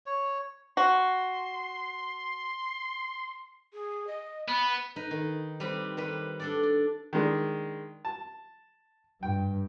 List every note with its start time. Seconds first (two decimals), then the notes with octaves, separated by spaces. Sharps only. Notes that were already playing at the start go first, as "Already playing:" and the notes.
0.06 C#5
0.77 F#4 C6
3.73 G#4
4.07 D#5
4.48 B3 B5
4.96 D#4 B4
5.11 D#3
5.60 G3 C4 B4
5.97 D#3 G3 B4
6.40 D4 A4 D5
6.63 D5
7.13 D#3 G#3 D4
8.05 A5
9.23 G2 G5